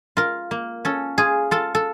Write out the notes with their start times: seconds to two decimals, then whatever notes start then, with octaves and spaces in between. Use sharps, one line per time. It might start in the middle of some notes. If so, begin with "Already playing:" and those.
0.17 F4 A#4
0.51 A#3
0.85 C#4 A4
1.18 F4 G#4
1.51 F4 A4
1.75 A4